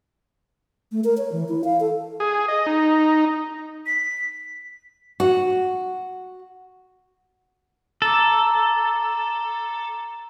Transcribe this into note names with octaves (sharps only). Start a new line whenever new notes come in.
A3
A#4
C#5
E3
E4
F5
A4
G#4
D#5
D#4
B6
F#4
A4 A#5 D6